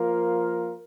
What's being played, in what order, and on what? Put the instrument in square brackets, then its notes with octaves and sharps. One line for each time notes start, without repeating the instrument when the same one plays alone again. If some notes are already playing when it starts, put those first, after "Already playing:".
Already playing: [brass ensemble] F3 A#3 F4 A#4